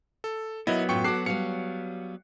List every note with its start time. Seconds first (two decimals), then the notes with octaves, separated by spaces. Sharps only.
0.24 A4
0.67 F#3 A#3 B3 E4 D#5
0.89 F#2 A2 F4 G5 C#6 C#7
1.04 F#4 A4 D6 F#6 C7
1.26 G3 C#5 F5 C#7